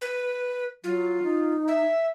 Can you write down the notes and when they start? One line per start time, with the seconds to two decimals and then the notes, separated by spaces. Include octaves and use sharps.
0.01 B4
0.84 F#3 F4
1.23 D#4
1.68 E5